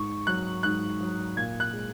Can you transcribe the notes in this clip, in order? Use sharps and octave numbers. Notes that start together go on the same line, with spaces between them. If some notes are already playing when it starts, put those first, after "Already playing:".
Already playing: G#2 C#6
F#3 F#6
G#2 F#6
F#3
A#2 G#6
F#6
G#3